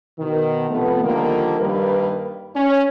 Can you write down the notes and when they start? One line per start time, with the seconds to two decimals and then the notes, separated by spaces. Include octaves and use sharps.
0.19 B2 D#3
0.70 C3 F3 A3 B3
1.04 D3 D#3 F3 G3 A#3
1.60 G2 D#3 G3 A#3 B4
2.56 C#4